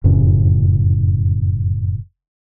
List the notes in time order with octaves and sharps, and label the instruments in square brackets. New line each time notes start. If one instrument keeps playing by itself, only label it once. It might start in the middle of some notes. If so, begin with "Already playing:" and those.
[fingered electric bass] F1 F#2 A2 C#3